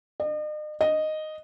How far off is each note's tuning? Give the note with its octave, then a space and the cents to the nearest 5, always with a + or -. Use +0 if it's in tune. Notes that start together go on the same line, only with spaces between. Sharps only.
D#5 -45
D#5 -5